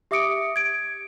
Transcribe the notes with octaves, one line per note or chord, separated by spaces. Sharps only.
G4 E5 D6 D#6 C#7 D7
G#6 D7